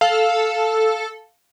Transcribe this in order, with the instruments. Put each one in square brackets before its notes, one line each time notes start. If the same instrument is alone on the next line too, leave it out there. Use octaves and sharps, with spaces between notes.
[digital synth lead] A4 [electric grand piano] F5